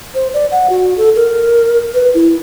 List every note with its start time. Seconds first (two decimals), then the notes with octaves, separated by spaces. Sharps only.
0.15 C5
0.34 D5
0.52 F#5
0.70 F#4
0.98 A4
1.16 A#4
1.94 B4
2.14 E4